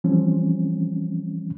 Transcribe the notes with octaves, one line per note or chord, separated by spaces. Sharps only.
E3 F3 G3 C4 C#4